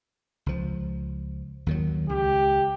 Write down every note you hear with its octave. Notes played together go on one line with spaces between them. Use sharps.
C#2 F3
D#2 D#3 F#3
C#2 G4